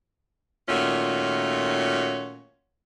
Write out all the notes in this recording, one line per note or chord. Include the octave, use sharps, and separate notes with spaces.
A#2 D#3 A3 C#4 F4 F#4